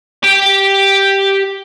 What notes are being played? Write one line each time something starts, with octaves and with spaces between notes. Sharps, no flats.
G4 G5